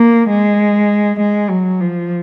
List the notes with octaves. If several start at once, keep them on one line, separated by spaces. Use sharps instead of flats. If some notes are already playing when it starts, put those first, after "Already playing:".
Already playing: A#3
G#3
G#3
F#3
F3